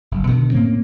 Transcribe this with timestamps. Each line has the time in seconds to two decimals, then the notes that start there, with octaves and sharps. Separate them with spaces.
0.11 F#1
0.27 B2 D3 D#3
0.52 A2 A#3 C4 C#4